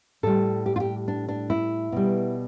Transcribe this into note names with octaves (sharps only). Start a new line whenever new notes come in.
A2 G3 A4
G4
F4
G4
D4
D4
E4
B2 G3